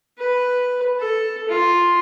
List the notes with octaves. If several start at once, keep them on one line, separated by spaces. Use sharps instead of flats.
B4
A4
F4